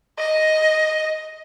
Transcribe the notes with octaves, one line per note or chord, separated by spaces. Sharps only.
D#5